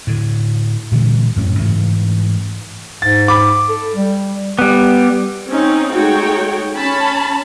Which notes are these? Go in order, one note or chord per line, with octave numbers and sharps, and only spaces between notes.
A2 D3
A#2 D3 E3 G#3
F#2 A2 C#4
G#2 C#3 E3 A3
G#2 A6
B5 D6
A4
G3
G3 B3
C4 C#4 D#4
G#3 A3 D#4 F#4 C#5 G5
C#4 A5 B5